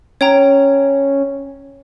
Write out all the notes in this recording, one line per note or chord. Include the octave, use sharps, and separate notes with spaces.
C#4 C#5 G5 A#5